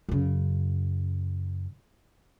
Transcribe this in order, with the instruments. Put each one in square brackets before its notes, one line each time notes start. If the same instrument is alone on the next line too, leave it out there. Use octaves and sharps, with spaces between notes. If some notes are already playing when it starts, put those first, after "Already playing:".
[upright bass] F#2 C#3